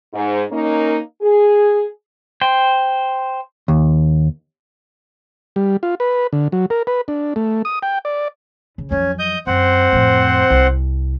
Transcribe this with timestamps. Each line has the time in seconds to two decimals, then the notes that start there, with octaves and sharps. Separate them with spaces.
0.13 G#2
0.51 A#3 C#4 D#4 A#4
1.21 G#4
2.41 C5 G5
3.68 D#2
5.56 G3
5.83 F4
6.00 B4
6.33 D3
6.52 F#3
6.70 A#4
6.87 B4
7.08 D4
7.36 A3
7.65 D#6
7.83 G5
8.05 D5
8.78 C#3
8.91 F2 F#3 C#4
9.19 D#5 D#6 G6
9.47 F#2 C4 C5 F#5
9.92 F2 A2
10.50 C2